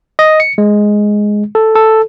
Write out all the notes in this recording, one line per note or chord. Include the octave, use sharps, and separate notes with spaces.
D#5
C#7
G#3
A4
A4